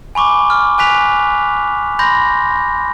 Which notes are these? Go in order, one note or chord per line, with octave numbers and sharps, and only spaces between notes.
G#5 B5 C#6 D6
F6
G#5 F#6 B6 F7
B5 C6 G6 A#6